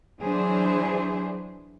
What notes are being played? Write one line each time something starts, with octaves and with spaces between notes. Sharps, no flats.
E3 F#3 D4 G#4 C5